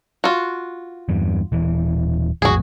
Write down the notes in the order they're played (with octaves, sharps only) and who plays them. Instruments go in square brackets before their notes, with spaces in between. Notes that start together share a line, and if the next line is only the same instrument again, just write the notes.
[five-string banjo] F4 F#4
[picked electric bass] E2 G2
D#1 E3
[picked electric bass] A#1 F2 A2 [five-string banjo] F#4 G#4